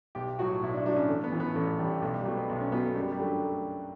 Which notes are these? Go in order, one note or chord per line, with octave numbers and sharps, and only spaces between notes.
B1 G4
A2 F#3 F#4
B1 E4
D4
A2 F#3 D4
C#4
A1 A3
B3
A2 E3
B3
A1 A3
A2 E3 G3
B1 A3
G3
B2 F#3 A3
B3
B1 A3
C#4
B2 F#3 B3
A3
F#2 G3
G3
D3 F#3 A3
A3